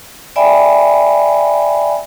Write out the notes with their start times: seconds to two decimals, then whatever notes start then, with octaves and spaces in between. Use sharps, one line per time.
0.36 D5 E5 G5 G#5 B5